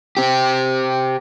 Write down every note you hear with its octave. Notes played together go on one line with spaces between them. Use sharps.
C4 G4